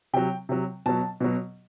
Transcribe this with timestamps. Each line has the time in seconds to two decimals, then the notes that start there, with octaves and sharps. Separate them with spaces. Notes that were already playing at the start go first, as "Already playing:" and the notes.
0.13 C3 F#3 G5
0.49 C3 F#3
0.86 B2 F#3 A5
1.20 B2 F#3